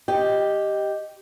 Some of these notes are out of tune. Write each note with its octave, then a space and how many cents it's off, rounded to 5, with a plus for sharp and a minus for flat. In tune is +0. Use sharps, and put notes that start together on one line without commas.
G4 +0 D#5 +0